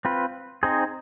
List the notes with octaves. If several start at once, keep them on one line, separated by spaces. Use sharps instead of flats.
C4 F4 B4
C4 D#4 G#4 C5